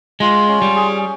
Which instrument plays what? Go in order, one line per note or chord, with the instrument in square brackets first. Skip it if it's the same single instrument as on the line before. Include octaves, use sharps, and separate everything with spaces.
[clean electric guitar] G#3 [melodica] F4
[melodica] C#4
[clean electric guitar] G3
[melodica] G#4